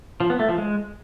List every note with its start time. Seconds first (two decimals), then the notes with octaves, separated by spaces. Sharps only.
0.20 F3
0.30 B3
0.39 A3
0.49 F3
0.58 G#3